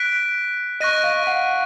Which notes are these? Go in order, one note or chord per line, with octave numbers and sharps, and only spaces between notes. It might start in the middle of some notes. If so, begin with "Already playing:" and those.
Already playing: F#6 B6 D7
D#5 C#6 F#6 A#6 D#7
F5
F5
F#5